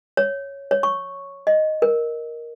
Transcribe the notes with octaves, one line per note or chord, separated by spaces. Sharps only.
C#5
C#5
C#6
D#5
A#4